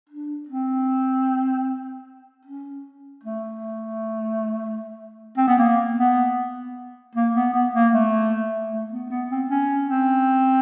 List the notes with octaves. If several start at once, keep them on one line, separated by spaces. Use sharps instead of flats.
D4
C4
C#4
A3
C4
B3
A#3
B3
A#3
B3
B3
A#3
A3
A3
B3
B3
C4
C#4
C4